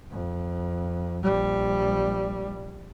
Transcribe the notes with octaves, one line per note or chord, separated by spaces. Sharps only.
F2
A#1 G3